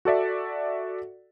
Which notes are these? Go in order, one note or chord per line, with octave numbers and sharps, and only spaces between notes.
F#4 A4 D5 E5